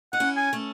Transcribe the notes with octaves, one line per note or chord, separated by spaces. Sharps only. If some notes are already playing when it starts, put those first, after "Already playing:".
D#4 F#5
C#4 E4
G#5
A3 C#4